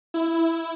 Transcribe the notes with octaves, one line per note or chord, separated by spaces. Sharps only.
E4